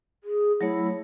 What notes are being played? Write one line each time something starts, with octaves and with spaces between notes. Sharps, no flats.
G#4
F#3 A3 E4 C#5